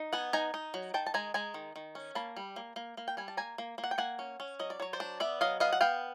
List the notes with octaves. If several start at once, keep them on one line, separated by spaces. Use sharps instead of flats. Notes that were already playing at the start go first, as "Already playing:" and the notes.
Already playing: D#4
B3 F#5 G#5
D#4 G#5 A#5
D#4
F#3
D#3 G5 A5
A5
G#3 G#5 A#5
G#3 G#5 A#5
D#3
D#3
C#4
A#3 A5 B5
G3
A#3
A#3
A#3
G5
G3 G#5
A5
A#3 G#5 A#5
A#3
A#3
F#5
G5
A#3 F#5 G#5
C#4
C#4
F#3 D#5
D5
F#3 C#5
C5 D5
D4
B3 D5 E5
F#3 D#5 F5
B3 D#5 F5
F#5
B3 F5 G5